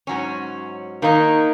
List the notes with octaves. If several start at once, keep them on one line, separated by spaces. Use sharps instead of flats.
G#2 F#3 C#4
D#3 A#3 D#4